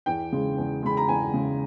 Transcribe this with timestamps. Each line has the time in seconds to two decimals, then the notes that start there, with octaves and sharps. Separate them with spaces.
0.06 E2 G5
0.32 C#3 G#3
0.57 E2
0.83 C#3 G#3 B5
0.97 A#5
1.08 E2 G#5
1.33 C#3 G#3